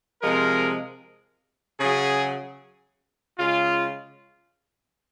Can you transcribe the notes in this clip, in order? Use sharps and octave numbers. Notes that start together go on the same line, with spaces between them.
C3 F3 G#3 A#4
C#3 F#3 G#4
C#3 G#3 F4